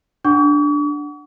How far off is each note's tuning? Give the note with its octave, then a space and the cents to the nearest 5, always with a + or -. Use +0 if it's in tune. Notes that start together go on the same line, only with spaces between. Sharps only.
D4 +0 F#5 +10 C#6 +45